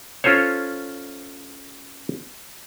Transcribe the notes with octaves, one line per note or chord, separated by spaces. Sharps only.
C#4 F4 A4 C5 C#5